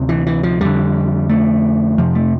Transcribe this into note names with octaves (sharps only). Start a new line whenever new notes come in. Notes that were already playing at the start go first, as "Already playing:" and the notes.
Already playing: D2 C3
E3
E3
F3
F2 D3 G3
A3
F2 C3 F3
A3